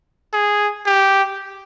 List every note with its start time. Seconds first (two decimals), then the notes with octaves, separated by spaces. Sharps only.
0.33 G#4
0.86 G4